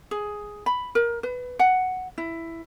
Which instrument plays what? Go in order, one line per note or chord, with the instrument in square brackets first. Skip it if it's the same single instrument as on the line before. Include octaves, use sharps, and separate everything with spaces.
[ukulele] G#4
B5
A#4
B4
F#5
E4